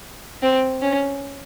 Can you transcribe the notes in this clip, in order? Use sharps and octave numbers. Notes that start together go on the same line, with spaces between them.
C4
C#4